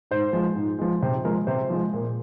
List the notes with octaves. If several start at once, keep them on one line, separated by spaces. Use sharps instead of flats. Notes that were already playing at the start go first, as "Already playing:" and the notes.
G#2 C5
F3 G#3
G#2
F3 G#3
C3 C5
F3 G#3 A#4
C3 C5
F3 G#3
A#2